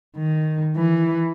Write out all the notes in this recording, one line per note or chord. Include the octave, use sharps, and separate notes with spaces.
D#3
E3